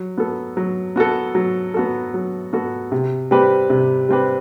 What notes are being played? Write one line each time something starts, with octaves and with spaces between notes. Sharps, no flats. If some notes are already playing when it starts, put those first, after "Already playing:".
Already playing: F#3
B3 F#4 A4
F#3
B3 F#4 A4
F#3
B3 F#4 A4
F#3
B3 F#4 A4
C3
G3 C4 G4 B4
C3
G3 C4 G4 B4